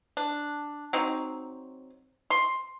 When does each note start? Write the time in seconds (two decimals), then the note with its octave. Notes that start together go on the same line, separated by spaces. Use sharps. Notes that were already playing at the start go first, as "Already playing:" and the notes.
0.17 D4
0.93 F#3 C4 D#4
2.30 C6